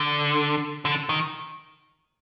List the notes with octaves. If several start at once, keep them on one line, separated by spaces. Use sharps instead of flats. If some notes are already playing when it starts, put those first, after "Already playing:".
Already playing: D3
D3
D#3